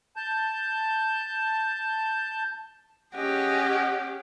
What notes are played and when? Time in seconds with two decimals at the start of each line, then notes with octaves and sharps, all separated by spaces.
0.16 A5 G6
3.15 C#4 G4 G#4 D#5 F#5